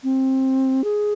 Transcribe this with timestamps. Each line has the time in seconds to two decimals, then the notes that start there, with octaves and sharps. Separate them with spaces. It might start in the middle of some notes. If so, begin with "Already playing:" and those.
0.04 C4
0.84 G#4